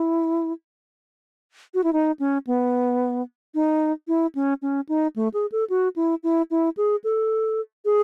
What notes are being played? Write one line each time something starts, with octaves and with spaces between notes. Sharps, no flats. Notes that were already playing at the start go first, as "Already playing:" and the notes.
Already playing: E4
F#4
E4
D#4
C#4
B3
D#4
E4
C#4
C#4
D#4
A3
G#4
A4
F#4
E4
E4
E4
G#4
A4
G#4